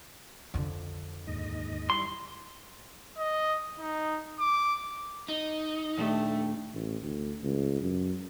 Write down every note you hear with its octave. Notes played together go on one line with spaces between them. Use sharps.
F2 D3
D#2 G#2 D#5
G3 E4 C6 C#6
D#5
D#4
D6
D#4
D#1 A3 D4 G4
A1
D2
C#2
F#2